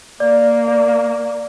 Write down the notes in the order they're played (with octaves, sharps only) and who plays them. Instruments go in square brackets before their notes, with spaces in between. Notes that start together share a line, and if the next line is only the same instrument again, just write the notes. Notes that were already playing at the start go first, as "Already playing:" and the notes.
[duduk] A#3 [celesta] D5
[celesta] D5